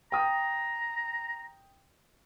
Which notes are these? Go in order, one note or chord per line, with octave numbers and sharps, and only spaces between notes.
G5 A#5 D#6